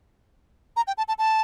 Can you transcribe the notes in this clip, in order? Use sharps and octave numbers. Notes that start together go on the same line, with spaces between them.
A#5
G5
A5
A5
A5